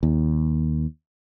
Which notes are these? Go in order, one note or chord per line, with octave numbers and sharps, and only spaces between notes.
D#2